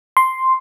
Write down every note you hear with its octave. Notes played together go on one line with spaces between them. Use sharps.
C6